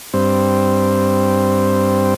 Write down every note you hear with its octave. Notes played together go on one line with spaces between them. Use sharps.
G2 C4